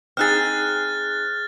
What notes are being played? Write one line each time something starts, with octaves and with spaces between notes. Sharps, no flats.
C4 D#4 G#4 F6 F#6 A6